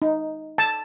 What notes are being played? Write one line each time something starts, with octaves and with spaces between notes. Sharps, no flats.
D#4
A5